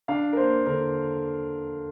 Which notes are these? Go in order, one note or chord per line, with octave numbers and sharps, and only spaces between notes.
D4 F5
A#4
A#3 C5
D3 A#4